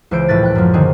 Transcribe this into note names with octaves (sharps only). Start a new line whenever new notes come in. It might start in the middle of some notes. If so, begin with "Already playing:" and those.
C#2 E3 C5 G6 D7
A#1 A2 B4 A6
G5 F#6
F#2 F3
D3 D#3 C4 G#4